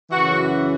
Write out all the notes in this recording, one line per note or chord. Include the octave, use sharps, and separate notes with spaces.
F#2 C#3 E3 F#4